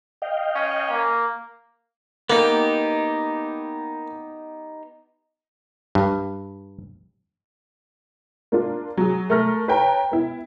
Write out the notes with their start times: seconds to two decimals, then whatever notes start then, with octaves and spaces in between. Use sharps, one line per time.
0.22 D#5 F5 G5
0.55 C#4
0.90 A#3
2.30 A#3 B3 D#4 G4
5.95 G2
8.52 A#3 D4 F4
8.97 F#3 G#4
9.30 A3 A#4 F6 A#6
9.68 B4 C#5 G5 A5 A#5
10.11 B3 E4